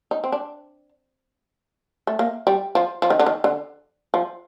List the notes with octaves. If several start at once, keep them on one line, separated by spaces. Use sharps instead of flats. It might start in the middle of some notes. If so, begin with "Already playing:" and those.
D#4
C4
D4
A3
A#3
G3
F3
F3
D#3
D3
D#3
D3
F3